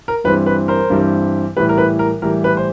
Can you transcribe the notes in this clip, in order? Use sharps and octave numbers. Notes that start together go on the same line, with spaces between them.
A#4
G2 E3 G3 C4 B4
B4
A#4 C5
G2 E3 G3 C4
A2 E3 G3 B4
A#4
B4
A#4
A2 E3 G3 A#4
B4
C5